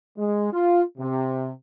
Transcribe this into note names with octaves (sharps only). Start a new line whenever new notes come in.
G#3
F4
C3